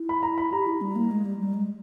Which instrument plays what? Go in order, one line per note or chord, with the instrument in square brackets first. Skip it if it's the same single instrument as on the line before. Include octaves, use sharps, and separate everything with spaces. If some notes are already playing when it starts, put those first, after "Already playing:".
Already playing: [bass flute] E4
[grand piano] B5
A#5
B5
[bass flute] G4 [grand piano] A#5
[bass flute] E4
G3
A#3
G#3
G3
G3
G#3